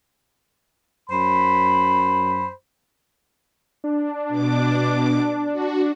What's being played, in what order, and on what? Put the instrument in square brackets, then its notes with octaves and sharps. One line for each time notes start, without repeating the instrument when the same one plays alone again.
[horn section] F#2 C5 B5
[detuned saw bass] D4
[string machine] B2 D6
F#4